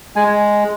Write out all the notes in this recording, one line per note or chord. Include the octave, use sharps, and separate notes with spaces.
G#3 G#5